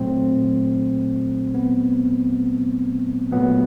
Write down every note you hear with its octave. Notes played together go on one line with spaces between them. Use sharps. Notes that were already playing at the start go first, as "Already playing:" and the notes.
Already playing: A#2 F#3 A3 C4
B3
A#2 F#3 A3 B3